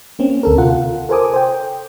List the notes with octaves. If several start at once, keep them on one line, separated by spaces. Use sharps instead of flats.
A#3 C4 C#4
D2 A4 A#4
C3 F4 F#5
A4 A#4 C5 G#5 D6 D#6
C5 G5